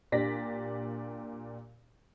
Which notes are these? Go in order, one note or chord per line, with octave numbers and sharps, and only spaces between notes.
A#2 D4 G4 D5 A#6 B6